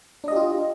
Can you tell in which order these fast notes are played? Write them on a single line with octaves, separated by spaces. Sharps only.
D4 D#5 G4 F4